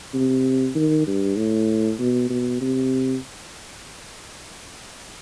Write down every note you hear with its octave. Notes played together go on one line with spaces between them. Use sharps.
C3
D#3
G2
A2
B2
B2
C3